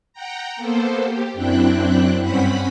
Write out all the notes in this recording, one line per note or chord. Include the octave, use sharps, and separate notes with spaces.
F#5 G5 A#5
A#3 B3 A4 C5
G4
F#2 C4 D4 E4 G5 F#6
G2 C4 C#4 F#5 B5 B6